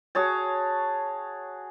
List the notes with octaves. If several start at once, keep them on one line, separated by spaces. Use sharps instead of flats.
F#4 G#4 C#5 A5